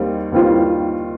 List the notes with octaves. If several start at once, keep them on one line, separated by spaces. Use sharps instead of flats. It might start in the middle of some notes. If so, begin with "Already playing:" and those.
Already playing: D#2 D#3 G3 C4
D#2 D#3 G3 C4 F4